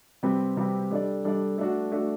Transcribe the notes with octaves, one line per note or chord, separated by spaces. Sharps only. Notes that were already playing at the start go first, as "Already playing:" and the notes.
C3 G3 C4 G4 B4
C3 G3 C4 G4 B4
G3 D4 A4 D5
G3 D4 A4 D5
A3 D4 F#4
A3 D4 F#4